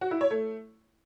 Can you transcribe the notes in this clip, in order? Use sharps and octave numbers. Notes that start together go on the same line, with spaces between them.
F#4
E4
C#5
A3